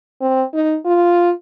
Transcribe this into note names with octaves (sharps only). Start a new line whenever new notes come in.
C4
D#4
F4